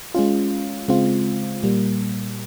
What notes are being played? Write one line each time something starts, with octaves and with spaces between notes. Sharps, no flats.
G#3 C#4 F4
C#3 G#3 C4 F4
A#2 G3 A#3